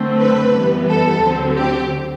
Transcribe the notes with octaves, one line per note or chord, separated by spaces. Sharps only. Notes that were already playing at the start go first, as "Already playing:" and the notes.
Already playing: F#2 D3 A3 C4
B4
F#2 E3 G3 B3
A4
D2 D3 F#3 C4
G4